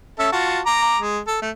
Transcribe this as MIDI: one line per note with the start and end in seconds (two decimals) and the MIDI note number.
0.19 0.28 61
0.19 0.28 69
0.19 0.28 76
0.32 0.61 65
0.32 0.61 66
0.32 0.61 81
0.66 0.99 82
0.66 0.99 86
0.99 1.20 56
1.27 1.37 69
1.42 1.50 57